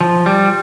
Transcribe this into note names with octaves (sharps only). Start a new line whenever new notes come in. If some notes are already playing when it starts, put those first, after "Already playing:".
F3
G3